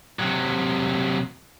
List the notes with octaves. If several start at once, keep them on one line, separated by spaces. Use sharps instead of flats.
C3 F#3